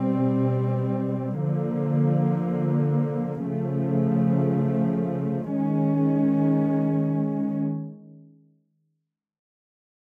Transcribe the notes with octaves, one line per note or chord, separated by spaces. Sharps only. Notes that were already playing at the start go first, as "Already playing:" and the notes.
Already playing: B2 G3 C4
D3 F3 A#3
C#3 F3 A3
D#3 G#3 C#4